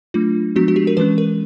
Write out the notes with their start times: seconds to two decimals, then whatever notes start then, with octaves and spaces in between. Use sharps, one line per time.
0.14 F#3 A3 D4 F4
0.56 F3 G#3 B3 D4 F#4
0.68 F#4
0.76 G4
0.87 A#4
0.97 E3 G#3 C#4 B4
1.18 A#4